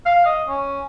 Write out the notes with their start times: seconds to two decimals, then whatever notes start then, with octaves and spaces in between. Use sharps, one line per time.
0.06 F5
0.26 D#5
0.48 C#4